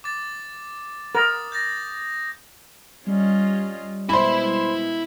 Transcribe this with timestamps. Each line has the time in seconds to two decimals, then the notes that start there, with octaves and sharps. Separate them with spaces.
0.04 D6 A6
1.15 A#4 D#6 A6
1.52 G6 A6 A#6
3.07 G3 C#4 F4 D#5
4.09 B2 G#3 B3 E4 C5 E5 B5